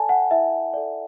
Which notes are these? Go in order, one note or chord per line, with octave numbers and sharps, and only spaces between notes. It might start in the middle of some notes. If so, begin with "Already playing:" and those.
Already playing: A4 D5 G#5 A5
F#5
E4 E5
A4 D5